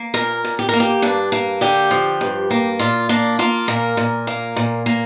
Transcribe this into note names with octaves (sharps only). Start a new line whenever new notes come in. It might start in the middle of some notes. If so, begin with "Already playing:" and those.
Already playing: A#3
A#2 A#4
A#2
G4
A#3 A#4
G4
G2 D4
A#3
D3 G4
F3
G2
A#3
A#2 F4
A#3 D4
A#3 F4
A#2 A#4
A#2
A#3
A#2
A#3